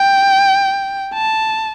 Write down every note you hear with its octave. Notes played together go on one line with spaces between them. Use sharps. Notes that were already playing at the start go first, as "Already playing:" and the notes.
Already playing: G5
A5